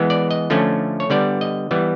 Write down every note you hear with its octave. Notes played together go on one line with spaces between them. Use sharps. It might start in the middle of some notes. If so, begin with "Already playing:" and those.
Already playing: E3 G#3 B3
D5
D#5
D3 F3 A3 C#4
C#5
D3 G3 B3 D5
D#5
E3 G3 B3